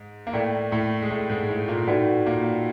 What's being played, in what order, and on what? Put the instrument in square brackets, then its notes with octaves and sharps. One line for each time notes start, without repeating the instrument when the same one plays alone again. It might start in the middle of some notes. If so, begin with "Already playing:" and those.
Already playing: [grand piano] G#2
A#3
[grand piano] A2 A3 [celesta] A#4 D5 G5
[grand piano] A2 A3
G#3
A2 A3
G#2 G#3
A2 A3
A#2 A#3
[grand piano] A2 A3 [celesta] D#4 F#4 B4 D5 F#5
[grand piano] A#2 A#3